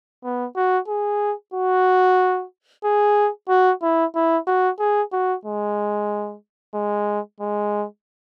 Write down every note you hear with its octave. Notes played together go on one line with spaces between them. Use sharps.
B3
F#4
G#4
F#4
G#4
F#4
E4
E4
F#4
G#4
F#4
G#3
G#3
G#3